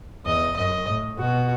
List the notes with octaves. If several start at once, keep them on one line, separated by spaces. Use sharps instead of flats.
E2 D#5
F#2 D#5
A2
B2 F#4